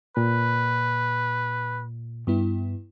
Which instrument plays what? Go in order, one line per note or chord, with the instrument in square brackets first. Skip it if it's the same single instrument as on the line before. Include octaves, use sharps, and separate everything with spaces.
[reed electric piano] A#2 [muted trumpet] B4
[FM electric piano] G2 B3 E4